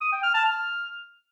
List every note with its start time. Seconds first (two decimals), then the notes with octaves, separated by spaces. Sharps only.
0.01 D#6
0.12 G5
0.23 F6
0.34 A5
0.45 F6